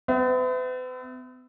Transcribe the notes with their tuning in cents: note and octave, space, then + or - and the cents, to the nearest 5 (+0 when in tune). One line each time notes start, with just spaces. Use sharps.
B3 +45 E5 +5